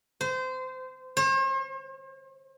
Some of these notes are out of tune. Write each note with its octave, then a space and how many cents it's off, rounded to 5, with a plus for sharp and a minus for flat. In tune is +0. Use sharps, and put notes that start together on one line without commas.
C5 -25
C5 +45